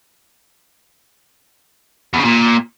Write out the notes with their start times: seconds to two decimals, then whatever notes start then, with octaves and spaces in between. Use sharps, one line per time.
2.13 E2
2.19 C#3
2.24 A#2